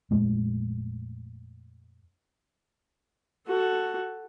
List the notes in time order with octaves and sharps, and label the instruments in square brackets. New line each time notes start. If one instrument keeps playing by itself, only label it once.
[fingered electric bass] F2 A#2 G#3 A3
[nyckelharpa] F#4 A4